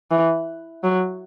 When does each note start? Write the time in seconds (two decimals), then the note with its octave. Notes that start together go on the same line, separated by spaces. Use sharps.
0.11 E3
0.83 F#3